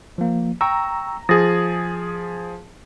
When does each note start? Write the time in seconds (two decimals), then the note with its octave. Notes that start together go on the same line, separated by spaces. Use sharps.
0.18 F3 A#3
0.61 G5 A#5 C#6 E6
1.29 F3 G#4 D#6 A6 A#6